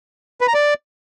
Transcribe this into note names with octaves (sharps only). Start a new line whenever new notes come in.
B4
A#5
D5